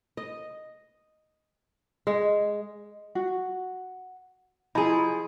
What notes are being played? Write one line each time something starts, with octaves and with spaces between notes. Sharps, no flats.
D#5
G#3
F#4
F3 E4 G#4 D#5 A#5